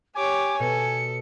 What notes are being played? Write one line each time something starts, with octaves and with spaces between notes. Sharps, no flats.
G4 C#5 G#5 D6
B2 A4 C#7